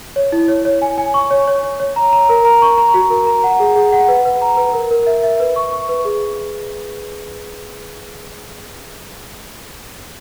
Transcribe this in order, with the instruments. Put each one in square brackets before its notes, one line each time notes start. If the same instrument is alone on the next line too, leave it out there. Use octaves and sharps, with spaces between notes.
[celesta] C#5
E4
C#5
C#5
G#5
G#5
C#6
C#5
C#5
C#5
C#5
A#5
A#5
A#4
A#5
C#6
A#5
F#4
A#4
A#5
F#5
G#4
G#4
F#5
B4
B4
A#5
B4
A#4
A#4
E5
E5
B4
C#6
C#6
B4
G#4